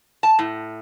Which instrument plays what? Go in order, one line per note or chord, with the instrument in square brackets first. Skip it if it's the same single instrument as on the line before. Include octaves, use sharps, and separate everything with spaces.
[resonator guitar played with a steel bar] A5
A2